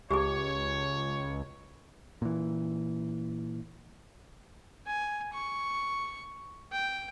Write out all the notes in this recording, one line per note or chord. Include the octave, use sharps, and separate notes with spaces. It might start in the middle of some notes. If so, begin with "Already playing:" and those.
C#2 G4 G#4 C#5
A#2 E3
G#5
C#6
G5